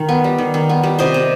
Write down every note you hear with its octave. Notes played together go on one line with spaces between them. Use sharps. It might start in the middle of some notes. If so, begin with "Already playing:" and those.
Already playing: D#3
B3
G3
D#3
D#3
B3
G3
C3 C5 D#5
C3